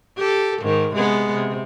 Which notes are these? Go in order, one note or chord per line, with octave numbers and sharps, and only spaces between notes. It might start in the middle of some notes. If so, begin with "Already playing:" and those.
G4 A4
G#2 D#3
C3 G#3 B3
C3